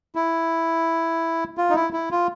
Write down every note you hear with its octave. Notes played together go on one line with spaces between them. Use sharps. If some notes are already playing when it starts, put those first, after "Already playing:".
E4
F4
D#4
E4
E4
F4